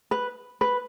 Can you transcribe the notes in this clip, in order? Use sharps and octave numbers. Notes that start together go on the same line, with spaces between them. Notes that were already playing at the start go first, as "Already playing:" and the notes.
B4
B4